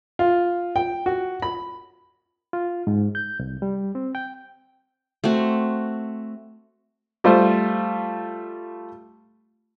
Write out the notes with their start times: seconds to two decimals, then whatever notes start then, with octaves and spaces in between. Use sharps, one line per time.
0.19 F4
0.76 G5
1.06 F#4
1.42 B5
2.53 F4
2.87 G#2
3.15 G6
3.39 C2
3.62 G3
3.95 C4
4.15 G5
5.24 A3 C4 F#4
7.24 G3 A3 F4 C5